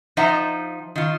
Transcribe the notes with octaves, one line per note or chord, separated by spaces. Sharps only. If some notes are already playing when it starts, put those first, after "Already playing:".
F3 D#4 C5 E5 F#5 A#5
D#3 F4